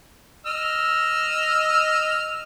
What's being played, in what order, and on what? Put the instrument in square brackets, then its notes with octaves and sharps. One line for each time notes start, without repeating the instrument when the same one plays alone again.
[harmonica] D#5 E6 F6